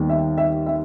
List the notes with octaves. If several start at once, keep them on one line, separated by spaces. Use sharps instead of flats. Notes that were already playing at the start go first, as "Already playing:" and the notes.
Already playing: D#2 D#3 G3 B3
E5
E5
E5